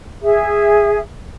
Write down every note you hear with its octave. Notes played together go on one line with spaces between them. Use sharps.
G#4 E5